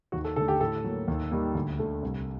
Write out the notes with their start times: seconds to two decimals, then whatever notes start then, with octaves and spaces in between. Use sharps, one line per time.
0.12 D#2 F#4
0.24 A4
0.36 D3 A3 A4
0.48 G4
0.60 A2 A4
0.84 F#3 A#3
1.08 D#2
1.31 D#3 G3 A#3
1.55 D2
1.79 D3 A3
2.03 C2